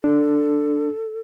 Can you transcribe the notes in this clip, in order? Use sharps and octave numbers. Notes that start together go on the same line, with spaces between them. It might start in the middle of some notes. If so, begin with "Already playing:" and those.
D4 A4